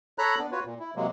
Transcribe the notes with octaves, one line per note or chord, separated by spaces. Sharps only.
A4 C#5 A#5 B5 F#6
B3 D4
F4 F#4 B4 C#5
A#2
E4
C3 F#3 G#3 A#3